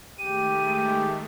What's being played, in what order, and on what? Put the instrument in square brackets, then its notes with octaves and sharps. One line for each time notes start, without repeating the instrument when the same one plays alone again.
[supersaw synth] D#3 G#3 A3 [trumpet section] G4 [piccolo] D#7